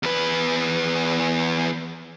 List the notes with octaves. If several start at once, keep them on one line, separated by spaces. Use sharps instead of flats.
E2 B4